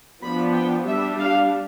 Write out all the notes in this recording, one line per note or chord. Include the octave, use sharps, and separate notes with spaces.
F3 B3 D4 B5
G5
G3 D4 E5
F5